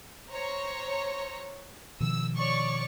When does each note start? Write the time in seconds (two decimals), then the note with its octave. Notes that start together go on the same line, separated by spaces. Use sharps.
0.31 C5 C#5 A#5
2.00 B2 D#3 F3 E6
2.35 C#5 D5 C#6